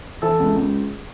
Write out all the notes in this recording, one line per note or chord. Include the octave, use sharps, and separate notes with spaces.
E3 A4
C#2
C#2